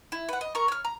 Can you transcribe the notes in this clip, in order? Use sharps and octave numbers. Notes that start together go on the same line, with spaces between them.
E4
B4 F#5
D#5
A#4 A#5 C#6
C#5 F6
A#5